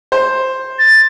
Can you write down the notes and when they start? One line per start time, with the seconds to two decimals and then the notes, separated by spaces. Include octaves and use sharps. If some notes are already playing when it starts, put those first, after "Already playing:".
0.12 C5
0.79 A6